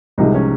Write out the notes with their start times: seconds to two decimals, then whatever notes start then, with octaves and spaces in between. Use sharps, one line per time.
0.18 C2 C3 F3 G#3 D#4
0.34 C#4